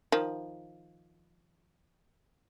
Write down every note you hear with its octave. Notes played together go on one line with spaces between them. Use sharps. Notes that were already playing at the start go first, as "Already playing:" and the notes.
D#3 F3